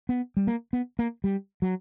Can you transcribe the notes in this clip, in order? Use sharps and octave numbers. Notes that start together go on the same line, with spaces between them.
B3
G3
A#3
B3
A#3
G3
F#3